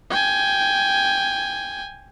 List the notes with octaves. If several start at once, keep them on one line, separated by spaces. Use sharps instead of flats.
G5 G#5